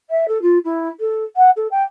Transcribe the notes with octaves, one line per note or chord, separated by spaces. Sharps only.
E5
A4
F4
E4
A4
F#5
A4
G5